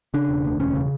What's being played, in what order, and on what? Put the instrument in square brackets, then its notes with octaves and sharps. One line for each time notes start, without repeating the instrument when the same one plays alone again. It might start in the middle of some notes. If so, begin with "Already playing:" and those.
[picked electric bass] C#3 D4
E1
D2
E1 C#4
C#3